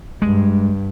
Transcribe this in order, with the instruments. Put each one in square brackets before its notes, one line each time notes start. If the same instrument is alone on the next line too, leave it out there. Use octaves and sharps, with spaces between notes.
[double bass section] G2 [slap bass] G#3